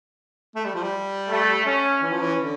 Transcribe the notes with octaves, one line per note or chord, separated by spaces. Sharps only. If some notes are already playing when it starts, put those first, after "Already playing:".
A3
G3
F3
G3
A3
C#4
E3 C#4
F3
E3
D3